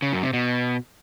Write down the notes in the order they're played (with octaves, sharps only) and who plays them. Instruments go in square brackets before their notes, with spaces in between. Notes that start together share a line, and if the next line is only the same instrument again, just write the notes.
[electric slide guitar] C#3
F#2
C3
B2